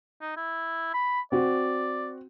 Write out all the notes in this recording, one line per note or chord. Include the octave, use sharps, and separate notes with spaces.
D#4
E4
B5
C4 F#4 D5